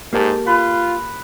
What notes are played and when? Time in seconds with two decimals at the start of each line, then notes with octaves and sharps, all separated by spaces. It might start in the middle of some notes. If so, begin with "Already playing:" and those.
0.13 G#2 A#3 G4 A4
0.47 F4 B4